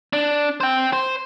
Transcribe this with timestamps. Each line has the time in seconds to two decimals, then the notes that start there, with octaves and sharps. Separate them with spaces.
0.13 D4
0.60 C5 G5
0.93 C5